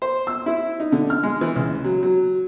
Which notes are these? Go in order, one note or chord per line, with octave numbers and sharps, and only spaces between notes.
C5
E6
E4
D#4
D3
F6
G#3
E3
C#2
F#3
F#3